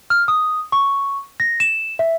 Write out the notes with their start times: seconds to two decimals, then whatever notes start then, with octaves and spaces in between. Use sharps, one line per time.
0.10 F6
0.28 D#6
0.72 C#6
1.40 A#6
1.60 E7
1.99 E5